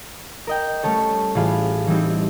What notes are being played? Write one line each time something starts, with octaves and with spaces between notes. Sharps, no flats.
A#4 D#5 G5
G3 A3 C#4 A4 C#5
A1 E3 F4 G#4 F5 B5
E3 G3 C4 D#4